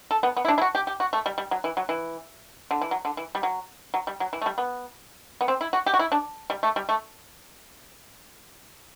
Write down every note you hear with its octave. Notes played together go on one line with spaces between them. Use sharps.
A4
B3
B3
E4
D4
E4
F#4
G4
G4
F#4
A3
G3
G3
F#3
E3
F#3
E3
D3
E3
F#3
D3
E3
G3
F#3
F#3
G3
F#3
E3
A3
G3
B3
B3
C4
E4
F#4
G4
F#4
E4
D4
G3
A3
G3
A3